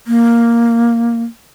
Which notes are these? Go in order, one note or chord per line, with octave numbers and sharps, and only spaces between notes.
A#3